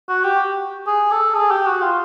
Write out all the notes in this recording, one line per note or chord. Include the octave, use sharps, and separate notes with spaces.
F#4
G4
G#4
A4
G#4
G4
F#4
F4